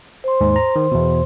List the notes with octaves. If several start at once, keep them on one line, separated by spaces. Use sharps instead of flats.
C5 C6
D#2 G#2
A#5
D#3
E2 B2